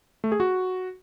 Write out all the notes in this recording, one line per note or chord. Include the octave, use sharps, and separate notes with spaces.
A3
G#4
F#4